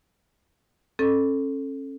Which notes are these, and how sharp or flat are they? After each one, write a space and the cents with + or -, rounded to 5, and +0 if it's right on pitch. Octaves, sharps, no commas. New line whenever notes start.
C#4 -35 A4 +0